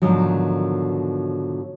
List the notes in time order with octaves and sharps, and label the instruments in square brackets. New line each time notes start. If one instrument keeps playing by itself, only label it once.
[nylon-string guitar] G#2 B2 D3 D#3 F3 F#3